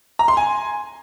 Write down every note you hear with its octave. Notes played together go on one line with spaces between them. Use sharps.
A#5
C6
G#5